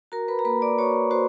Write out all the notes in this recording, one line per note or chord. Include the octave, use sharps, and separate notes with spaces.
F#4 A#4 A#5
B4 B5
A#5
A#3 B4 B5
D5 D6
F#4 C#5 C#6
F#4 C5 C6